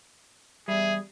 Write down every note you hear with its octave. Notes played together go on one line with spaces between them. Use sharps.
E2 G3 G#4 E5